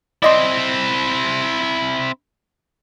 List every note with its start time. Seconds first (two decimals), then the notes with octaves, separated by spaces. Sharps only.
0.22 C4 E4 D5 D#5 C6